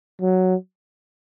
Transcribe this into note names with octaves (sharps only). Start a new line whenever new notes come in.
F#3